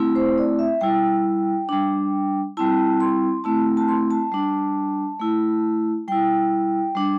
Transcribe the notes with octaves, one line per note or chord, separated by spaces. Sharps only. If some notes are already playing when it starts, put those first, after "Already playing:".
Already playing: A3 C4 E4
C5
D5
E5
G3 E4 G5
G3 D4
G3 C4 E4 A5
C6
A3 C4 E4 A5
A5
C6
A5
G3 D4
A3 E4
G3 E4 G5
G3 D4